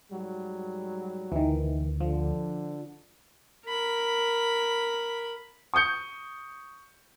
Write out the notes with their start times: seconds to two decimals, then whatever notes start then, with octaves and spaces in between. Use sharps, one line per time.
0.11 G#2 F#3 G3
1.32 D2 D#3 E3
2.01 D3 F3
3.66 A#4 B5
5.74 C#6 D#6 G6 C#7